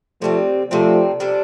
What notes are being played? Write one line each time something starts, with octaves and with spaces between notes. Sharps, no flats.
C3 F3 G3 A3 C4
C3 F3 G3 A3 C4
C3 G3 D4 A4